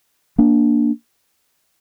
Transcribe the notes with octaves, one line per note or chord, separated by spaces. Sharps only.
A#3 D4